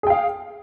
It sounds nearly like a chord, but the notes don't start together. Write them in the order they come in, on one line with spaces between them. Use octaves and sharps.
G#4 G5 F5